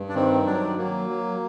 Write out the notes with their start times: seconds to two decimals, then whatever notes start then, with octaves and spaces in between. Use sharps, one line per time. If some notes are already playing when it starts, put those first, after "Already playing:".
Already playing: G2
0.09 D4
0.15 D#3 C4
0.46 F#3 D4
0.78 F#3 A#3
1.09 F#3